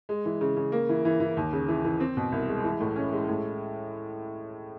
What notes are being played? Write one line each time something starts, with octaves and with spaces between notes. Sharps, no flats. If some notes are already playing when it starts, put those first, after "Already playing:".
G#3
E3
C#3
C#3
A#3
E3
E3
E3
D#2
C#3
E3
E3
C4
B2
C2
G#3
E3
A2
C#4
G#3
A2